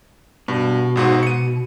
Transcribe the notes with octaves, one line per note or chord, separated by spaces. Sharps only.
G2 B2
G#1 G#2 F#4
C#7 D#7